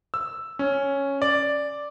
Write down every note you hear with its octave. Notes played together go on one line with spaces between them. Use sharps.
E6
C#4
D5